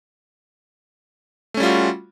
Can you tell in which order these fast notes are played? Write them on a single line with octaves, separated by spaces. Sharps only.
A3 C#4 G3 F4 F#4